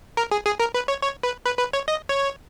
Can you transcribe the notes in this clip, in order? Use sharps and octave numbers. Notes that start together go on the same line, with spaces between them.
A#4
G#4
G#4
A#4
B4
C#5
C#5
B4
B4
B4
C#5
D#5
C#5